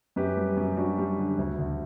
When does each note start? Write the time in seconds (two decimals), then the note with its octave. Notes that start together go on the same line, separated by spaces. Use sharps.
0.16 F#2 G4 B4
0.37 G3
0.57 F#2
0.77 G3 D4 F#4
0.99 G3
1.18 D3
1.38 D2
1.59 D2